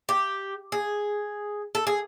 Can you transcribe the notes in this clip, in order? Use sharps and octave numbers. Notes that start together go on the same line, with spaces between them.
G4
G#4
A4
G#4